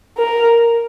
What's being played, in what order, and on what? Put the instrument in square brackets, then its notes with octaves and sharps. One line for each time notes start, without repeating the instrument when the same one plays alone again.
[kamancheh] A#4